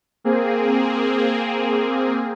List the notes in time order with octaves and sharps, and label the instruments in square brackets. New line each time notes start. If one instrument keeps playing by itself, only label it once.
[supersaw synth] A#3 C4 G#4